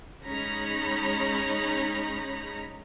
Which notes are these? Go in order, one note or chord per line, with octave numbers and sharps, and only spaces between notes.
G#3 C#4 D#4 A#5 B5